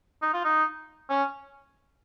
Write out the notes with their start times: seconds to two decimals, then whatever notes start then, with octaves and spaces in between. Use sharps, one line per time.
0.22 D#4
0.33 F4
0.44 D#4
1.10 C#4